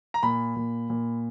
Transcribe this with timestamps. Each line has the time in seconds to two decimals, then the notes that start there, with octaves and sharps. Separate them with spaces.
0.14 A#5
0.23 A#2 B5
0.56 A#2
0.90 A#2